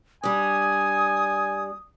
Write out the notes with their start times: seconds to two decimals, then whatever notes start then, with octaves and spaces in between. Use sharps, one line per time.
0.23 G3 D4 G#5 D#6